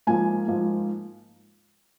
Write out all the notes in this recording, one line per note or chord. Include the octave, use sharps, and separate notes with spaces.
G#2 F3 A#3 G#5
G#2 F3 A#3